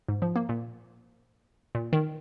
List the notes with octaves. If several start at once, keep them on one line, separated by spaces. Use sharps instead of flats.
G#2
F3
A#3
A#2
A#2
D#3